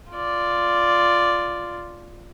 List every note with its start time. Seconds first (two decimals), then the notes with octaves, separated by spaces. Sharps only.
0.12 F4 D5